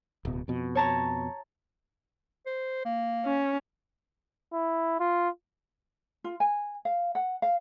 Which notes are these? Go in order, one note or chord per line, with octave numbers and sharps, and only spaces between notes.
D1 B2
F2 B2
C#5 A5 A#5
C5
A#3
C#4
E4
F4
F4
G#5
F5
F#5
F5